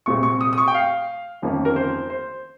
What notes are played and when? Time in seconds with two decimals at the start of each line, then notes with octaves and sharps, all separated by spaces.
0.06 C2 A#2 G#3 C4 C#6
0.23 C#6
0.41 D#6
0.53 D#6
0.58 C#6
0.68 G5
0.74 F5
1.42 G1 F2 D#3 A#3 C#4
1.65 A#4
1.76 C5
2.10 C5